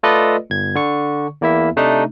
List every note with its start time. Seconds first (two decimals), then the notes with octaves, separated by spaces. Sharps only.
0.03 A3 F4 A4 B4 D5 D#5
0.50 G1 G#6
0.75 D3 C#6
1.41 E2 A#3 E4 E5
1.76 C3 A3 D4 D#4